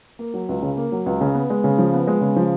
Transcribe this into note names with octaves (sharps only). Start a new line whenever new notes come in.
A#3
F#3
C#2
C#3
A#3
F#3
C#2
C#3
B3
G#3
C#3
F3
B3
G#3
C#3
F3